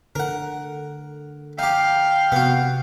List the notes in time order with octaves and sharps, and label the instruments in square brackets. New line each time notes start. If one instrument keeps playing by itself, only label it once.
[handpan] D3 [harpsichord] A#4 F#5
[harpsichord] D#4 G4 [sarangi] F5 [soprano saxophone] G5
[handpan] C3 [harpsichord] B3 F#4